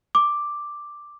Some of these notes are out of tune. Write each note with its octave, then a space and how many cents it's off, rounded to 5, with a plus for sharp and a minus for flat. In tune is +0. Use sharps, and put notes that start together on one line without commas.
D6 +5